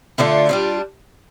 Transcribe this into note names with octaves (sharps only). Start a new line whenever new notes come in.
D3 A3 D4 F4
G3 D4 F4